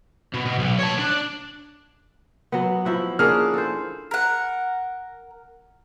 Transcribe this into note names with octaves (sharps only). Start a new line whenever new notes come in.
B2
B2
B1
C#5 A5
D4
F#3 B3
F3 E4 F#4
A#3 C#4 D4 G#4 F6
A4 C5
A#4 F#5